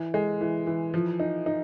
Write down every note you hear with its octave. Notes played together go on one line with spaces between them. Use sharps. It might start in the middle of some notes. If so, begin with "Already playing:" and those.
Already playing: E3
G#3
E3
E3
F3
D#4
D#4